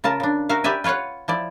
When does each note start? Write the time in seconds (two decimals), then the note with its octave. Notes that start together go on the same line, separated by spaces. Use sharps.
0.04 C#3 F4 A#4 A5
0.20 C#3 D4
0.49 F#4 A#4 E5 F5
0.64 G4 B4 D5 E5 G#5
0.84 F4 B4 C#5 F5 F#5
1.28 F3 E4 D5